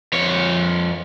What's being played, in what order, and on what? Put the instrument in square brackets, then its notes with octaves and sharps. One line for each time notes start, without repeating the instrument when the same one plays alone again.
[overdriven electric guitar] F2 C#5